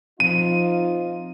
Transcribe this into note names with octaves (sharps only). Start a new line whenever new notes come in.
F3 C4 D#4 F4 D#7